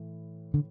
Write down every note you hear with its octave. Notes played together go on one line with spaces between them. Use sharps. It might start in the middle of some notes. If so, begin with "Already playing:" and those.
Already playing: A2 E3
D3